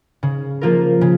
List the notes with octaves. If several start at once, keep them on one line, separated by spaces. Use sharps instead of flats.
C#3
F3 A#3 F4 A#4
C#3